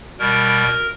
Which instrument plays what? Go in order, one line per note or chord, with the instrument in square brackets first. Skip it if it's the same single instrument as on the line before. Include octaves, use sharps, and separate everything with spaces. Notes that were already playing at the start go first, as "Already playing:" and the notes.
[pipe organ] B2 G3 A#4